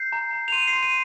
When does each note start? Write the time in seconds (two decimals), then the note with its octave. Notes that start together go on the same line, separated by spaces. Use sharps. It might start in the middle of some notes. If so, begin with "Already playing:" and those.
Already playing: G6 C7
0.12 A#5
0.33 A#5
0.48 F7
0.52 C6 D#7
0.67 C7
0.73 C6
0.83 D#7